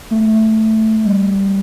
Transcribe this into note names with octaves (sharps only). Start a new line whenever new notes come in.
A3
G3